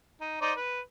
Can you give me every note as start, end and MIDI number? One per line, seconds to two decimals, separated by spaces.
0.21 0.37 63
0.41 0.53 63
0.41 0.53 72
0.41 0.53 74
0.56 0.80 71